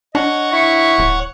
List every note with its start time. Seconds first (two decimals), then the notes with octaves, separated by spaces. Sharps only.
0.15 D4 C#5 D#5 F#5
0.52 E4 C#6
0.99 D1